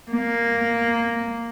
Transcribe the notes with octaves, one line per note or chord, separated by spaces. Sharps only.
A#3